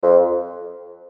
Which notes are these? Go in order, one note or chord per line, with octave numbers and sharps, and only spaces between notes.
F2